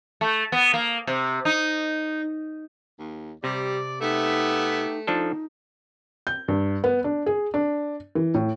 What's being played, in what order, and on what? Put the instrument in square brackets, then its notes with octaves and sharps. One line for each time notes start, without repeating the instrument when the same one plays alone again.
[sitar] A3
B3
A#3
C3
D#4
[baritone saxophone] D#2
[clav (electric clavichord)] C3 [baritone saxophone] G3 [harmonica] D5
[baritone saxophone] A3 [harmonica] B3 G4 E5 [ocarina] D#4
[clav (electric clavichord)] F3 D4 A4 [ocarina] D#4
[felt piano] G6
G2
B3
D4
G#4
D4
E3
A2